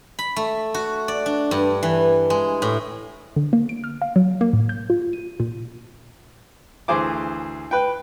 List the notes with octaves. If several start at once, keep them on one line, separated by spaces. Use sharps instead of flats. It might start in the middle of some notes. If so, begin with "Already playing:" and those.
B5
A3
F#4
D5
D4
G2
E3
G#3
A2
D3
A#3
D7
F6
F5
F#3
A#3
A2
G6
F4
D#7
A#2
D2 E3 G#4 C5 D6
B4 G5